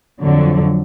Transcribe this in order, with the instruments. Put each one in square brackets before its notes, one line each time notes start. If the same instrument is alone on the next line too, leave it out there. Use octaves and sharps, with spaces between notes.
[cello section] F2 D3 F#3